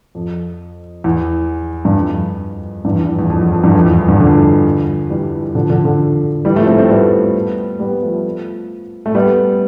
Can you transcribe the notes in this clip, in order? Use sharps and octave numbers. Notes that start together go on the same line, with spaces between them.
F2
E2
G2
F2
E2 G2
E2
E2
E2
F2
E2
F2
E2 G2
F2
E2
E2 G2
D3 F3
E3 G3
D3 F3
D3 F3
D3 F3
E3 G3
F3 A3
A3 C4
A3 C4
G3 B3
G3 B3
F3 A3
A3
G3 B3